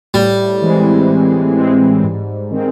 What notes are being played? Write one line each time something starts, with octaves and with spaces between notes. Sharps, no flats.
A2 G3
E3 G#3 C4
A2
E3 G#3 C4
G#2
D#3 G#3 C4